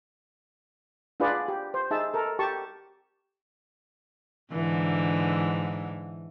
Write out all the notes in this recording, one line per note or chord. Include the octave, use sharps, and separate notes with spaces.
D4 F4 G#4 B4 D5
G4
C5
D#4 G#4 E5 A5
A4 A#4
G4 A5 C#6
G#2 D3 E3